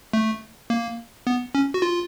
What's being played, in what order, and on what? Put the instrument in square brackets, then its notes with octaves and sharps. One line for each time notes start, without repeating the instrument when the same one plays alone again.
[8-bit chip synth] A3
A#3
B3
C#4
F#4
F4